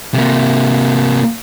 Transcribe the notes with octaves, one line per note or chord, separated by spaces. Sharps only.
C3 A#3